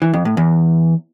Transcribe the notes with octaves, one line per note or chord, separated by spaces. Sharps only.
E3
F2
A2
E2